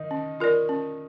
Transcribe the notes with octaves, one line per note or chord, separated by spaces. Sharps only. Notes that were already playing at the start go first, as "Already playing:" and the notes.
Already playing: D#3 D#4
C#4
F4 A#4 D5
C#4